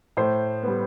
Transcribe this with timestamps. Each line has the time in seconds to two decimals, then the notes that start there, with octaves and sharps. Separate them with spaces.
0.17 A2 C5
0.63 G3 B3